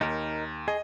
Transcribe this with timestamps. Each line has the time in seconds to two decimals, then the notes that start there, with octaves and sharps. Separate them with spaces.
0.01 D#2 D#4 A#4
0.68 G#4 D#5